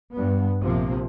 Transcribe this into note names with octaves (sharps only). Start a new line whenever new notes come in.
G2 B3
A#1 C3 F3 A#3